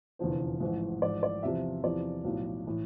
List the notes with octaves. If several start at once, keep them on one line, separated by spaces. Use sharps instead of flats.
F1 E2 D3 F3 C5
A1 G#2 F3
A1 G#2 F3 D5
D5
E2 C3 F3 E5
E2 C3 F3 D5
B1 A2 F3
A2 E3